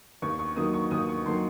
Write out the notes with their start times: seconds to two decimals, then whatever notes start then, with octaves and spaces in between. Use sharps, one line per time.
0.22 D#2 C#6
0.39 C#6
0.56 D#3 F#3 A#3 D#6
0.74 C#6
0.91 D#2 D#6
1.09 C#6
1.26 D#3 F#3 A#3 C6